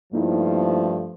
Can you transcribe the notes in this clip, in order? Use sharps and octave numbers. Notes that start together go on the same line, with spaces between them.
G2 F3 A3 A#3 D#4 E4